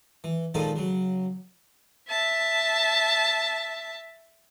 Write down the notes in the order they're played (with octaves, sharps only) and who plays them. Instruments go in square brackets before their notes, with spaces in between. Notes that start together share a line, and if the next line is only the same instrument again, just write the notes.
[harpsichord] E3
A#2 D#3 F3 G#3 D#4 A4
C#3 F#3
[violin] E5 A5